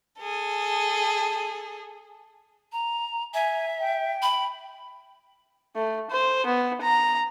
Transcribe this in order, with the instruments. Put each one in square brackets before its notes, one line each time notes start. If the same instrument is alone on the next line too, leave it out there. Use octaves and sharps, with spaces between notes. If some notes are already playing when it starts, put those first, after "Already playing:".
[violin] G#4 A4
[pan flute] A#5
[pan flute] E5 [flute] G#5
[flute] G5
[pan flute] B5
[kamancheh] A3
C5
B3
A#5